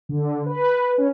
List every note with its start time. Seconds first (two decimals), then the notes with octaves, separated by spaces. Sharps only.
0.09 D3
0.46 B4
0.98 C#4